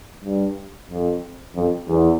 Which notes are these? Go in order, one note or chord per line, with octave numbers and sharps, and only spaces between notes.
G2
F2
F2
E2